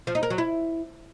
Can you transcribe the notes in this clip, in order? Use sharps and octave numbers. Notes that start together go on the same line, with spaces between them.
F3
D#4
A#4
F#3
E4